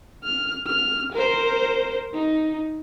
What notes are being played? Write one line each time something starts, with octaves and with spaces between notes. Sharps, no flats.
F6
F6
A#4 C5
D#4